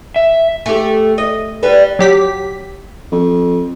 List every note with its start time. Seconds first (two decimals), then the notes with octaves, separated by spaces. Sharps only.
0.16 E5
0.66 A3 G4
1.18 D#5
1.63 G3 B4
1.99 F#3 G4 B6
3.12 F2